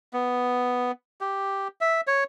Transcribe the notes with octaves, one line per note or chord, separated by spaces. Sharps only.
B3
G4
E5
C#5